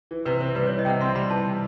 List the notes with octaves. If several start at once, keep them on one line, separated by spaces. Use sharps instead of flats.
E3
C3 B4
C4 C5
G3 B4
E3 C#5
D#5
C3 F#5 G5
C4 C6
G3 B5
E3 A5
C3